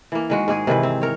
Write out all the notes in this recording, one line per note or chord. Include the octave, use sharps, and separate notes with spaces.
E3 A#3
D#3 G#3 F#4
G#2 G#3 G#4
C3 D#3 E3 B4
C4
A#4 C#5